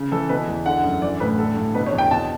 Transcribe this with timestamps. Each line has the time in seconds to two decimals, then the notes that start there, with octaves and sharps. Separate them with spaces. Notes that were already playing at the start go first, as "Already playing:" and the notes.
Already playing: C#3
0.12 E3 A4
0.29 B2 B4
0.47 E2
0.66 D3 F#5
0.84 F#2
1.02 E3 D5
1.20 A2 B4
1.38 D3 A4
1.57 G2
1.75 B2 B4
1.86 C#5
1.93 E2
1.98 G5
2.11 B2 A5